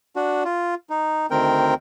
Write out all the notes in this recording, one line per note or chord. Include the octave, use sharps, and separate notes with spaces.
D4 F#4
F4
D#4
D2 D#3 C4 A#4 G5